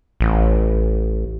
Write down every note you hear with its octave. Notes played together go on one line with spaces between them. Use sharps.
A1